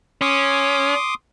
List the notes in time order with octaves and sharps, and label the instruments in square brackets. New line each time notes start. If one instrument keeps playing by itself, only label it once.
[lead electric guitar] C#4 [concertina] C6 D6 D#6